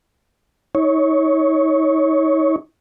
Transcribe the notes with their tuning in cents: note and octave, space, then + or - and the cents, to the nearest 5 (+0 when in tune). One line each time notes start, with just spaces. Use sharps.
D#4 +35 C#5 +0